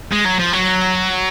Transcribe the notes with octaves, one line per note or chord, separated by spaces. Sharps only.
G#3
F#3
F3
F#3